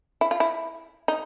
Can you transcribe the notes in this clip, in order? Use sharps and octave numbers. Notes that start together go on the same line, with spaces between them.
E4
F4
E4
D#4